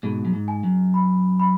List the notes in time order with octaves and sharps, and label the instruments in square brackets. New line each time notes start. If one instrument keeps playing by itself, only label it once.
[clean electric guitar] G#2 B2 [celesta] G#4
[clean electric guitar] F#2
G#2
[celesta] G#5
[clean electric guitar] F#2
[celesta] B5
B5